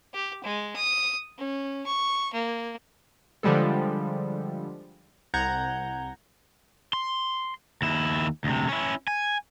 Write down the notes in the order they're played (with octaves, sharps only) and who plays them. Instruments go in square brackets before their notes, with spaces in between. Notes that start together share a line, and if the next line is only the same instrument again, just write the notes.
[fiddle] G4
G#3
D#6
C#4
C#6
A#3
[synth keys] D3 F3 G3 G#3 A4
C2 F#5 A#5 G6 G#6
[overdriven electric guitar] C6
D#2 E4
D2 C3
C#4 E4
G#5